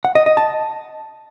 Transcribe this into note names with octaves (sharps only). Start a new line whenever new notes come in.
F#5
D#5
D#5
A5